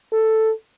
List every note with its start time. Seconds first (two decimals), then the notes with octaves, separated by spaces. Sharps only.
0.12 A4